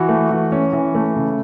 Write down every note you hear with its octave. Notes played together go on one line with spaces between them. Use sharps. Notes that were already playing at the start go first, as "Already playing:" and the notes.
Already playing: E3 F#4
A3
E3
C#4
E3
A3
C#3